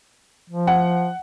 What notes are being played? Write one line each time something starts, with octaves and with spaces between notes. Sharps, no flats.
F3
F#5